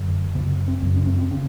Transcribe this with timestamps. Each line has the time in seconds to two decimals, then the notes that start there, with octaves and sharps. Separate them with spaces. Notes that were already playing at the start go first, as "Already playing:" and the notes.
Already playing: F#2 D3
0.35 C#3 B3
0.38 F#2
0.68 C4
0.83 F#2 C#3
0.96 C#4
1.07 C4
1.19 C4
1.31 C#3 C#4